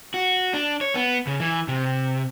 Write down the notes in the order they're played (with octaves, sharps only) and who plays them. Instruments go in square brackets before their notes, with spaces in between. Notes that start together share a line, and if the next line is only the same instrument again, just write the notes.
[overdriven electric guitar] F#4
D4
C#5
B3
C#3
E3
C3